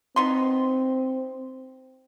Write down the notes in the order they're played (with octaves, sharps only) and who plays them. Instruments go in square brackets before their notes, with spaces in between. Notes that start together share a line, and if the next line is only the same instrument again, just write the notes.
[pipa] B3 D#4 C6 [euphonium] C4